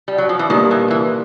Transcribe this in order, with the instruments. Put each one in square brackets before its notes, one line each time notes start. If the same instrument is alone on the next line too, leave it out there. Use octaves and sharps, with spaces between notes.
[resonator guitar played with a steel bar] G3
F#3
F3
E3
[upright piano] A#2 G3 A#3 D4 [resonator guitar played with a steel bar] D#3
[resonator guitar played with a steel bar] E3
E3